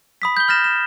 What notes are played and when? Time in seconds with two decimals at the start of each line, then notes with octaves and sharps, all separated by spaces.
0.22 B5 D#6 B6
0.37 G6 G7
0.48 B5 F6 A6 A#6 E7
0.64 E7